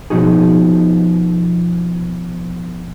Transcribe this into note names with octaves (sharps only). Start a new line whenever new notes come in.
B2 D#3 F3 D#4 F#4 G#4